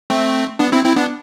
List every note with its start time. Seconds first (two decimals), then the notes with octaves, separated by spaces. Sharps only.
0.10 A3 C4
0.59 B3 D4
0.72 C4 E4
0.84 C4 E4
0.96 B3 D4